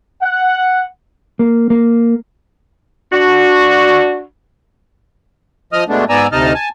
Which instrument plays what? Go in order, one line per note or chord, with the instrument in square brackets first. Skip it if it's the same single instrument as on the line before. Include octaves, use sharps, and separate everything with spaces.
[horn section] F#5
[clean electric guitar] A#3
A#3
[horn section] D4 F#4
[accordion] F3 D#5 D#6 F6
B2 G#3 A3 B3 D4
G#2 B3 D5 G#5 A#5 E6
D2 C3 D#4 D#5 A5 F6
G#5 A5